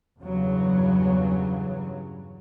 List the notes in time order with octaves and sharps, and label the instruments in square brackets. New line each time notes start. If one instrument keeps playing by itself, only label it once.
[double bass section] E2 G2 C#3 F#3